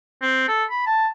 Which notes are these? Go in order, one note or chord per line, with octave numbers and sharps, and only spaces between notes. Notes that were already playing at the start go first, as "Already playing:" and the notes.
C4
A4
B5
A5